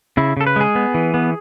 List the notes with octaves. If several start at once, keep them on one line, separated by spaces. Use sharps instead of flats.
C#3 E4
C#3 A4
B4
G#3 G#4
B3
E3
B3